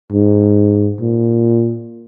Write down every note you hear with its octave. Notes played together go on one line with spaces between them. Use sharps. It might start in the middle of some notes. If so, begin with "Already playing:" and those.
G#2
A#2